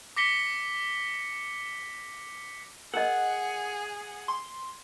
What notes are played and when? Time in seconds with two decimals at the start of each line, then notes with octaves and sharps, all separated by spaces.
0.17 D6 A#6 B6 C#7 G7
2.94 G#4 A#4 D#5 F#5
4.28 C6